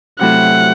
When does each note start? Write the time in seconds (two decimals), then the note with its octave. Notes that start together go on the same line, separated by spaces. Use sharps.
0.20 C3 F#3 A3 E4 A4 F#5